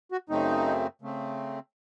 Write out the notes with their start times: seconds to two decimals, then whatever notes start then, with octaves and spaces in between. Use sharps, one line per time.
0.12 F#4
0.29 F#2 C#3 A3 C4 D#4
1.02 C#3 A3 C4